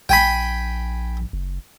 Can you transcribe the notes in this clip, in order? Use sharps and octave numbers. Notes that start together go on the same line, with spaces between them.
A#1 G5 G#5 B5
F#1